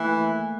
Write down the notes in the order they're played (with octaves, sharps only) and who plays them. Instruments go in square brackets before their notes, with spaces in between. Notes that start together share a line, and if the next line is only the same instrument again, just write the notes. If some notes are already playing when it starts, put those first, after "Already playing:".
Already playing: [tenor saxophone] E3 [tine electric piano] A3 A#3